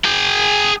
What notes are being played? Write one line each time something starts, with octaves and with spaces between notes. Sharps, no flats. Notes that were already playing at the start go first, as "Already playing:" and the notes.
G#4 G5